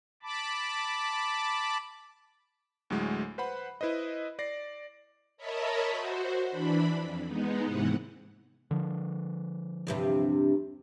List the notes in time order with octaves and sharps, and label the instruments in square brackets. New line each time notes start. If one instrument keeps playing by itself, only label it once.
[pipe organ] A5 B5 D6
[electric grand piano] D2 A2 F#3 G#3
B4 C5 F#5 B5
E4 B4 C5 D#5
D5 A#6 C7
[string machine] A#4 C#5 D#5 E5 A5 B5
F#4 C5
E3 D4 B5
F2
G#3 B3 D#4
D#2 G#2 C3 E3 F#5
[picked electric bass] D3 F3
[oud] E2 G2 C3